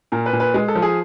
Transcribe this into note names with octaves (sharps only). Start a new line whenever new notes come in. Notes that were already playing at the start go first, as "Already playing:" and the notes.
A#2 A#4
B4
A#2
B4
G#3
A4
F3
G#4